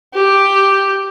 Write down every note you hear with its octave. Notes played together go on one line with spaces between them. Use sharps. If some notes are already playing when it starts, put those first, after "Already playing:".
G4